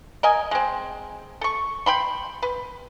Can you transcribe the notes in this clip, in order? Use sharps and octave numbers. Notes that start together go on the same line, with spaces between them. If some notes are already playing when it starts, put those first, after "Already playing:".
A#4 D#5 G#5
G#3 C4
A4 C#6
G5 B5 C6
B4